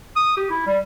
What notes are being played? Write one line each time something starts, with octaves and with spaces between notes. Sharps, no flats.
D#6
G4
E4
G3